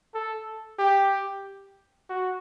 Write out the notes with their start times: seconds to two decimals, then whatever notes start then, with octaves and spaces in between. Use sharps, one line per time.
0.14 A4
0.79 G4
2.09 F#4